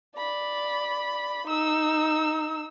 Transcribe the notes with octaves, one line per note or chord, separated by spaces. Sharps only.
D5 B5
D#4 E6